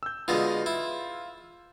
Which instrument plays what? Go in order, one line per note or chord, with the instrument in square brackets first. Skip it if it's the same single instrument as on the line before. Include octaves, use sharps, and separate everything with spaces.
[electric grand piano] E6 G6
[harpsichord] B2 D3 G#3 [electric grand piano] F4
[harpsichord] E4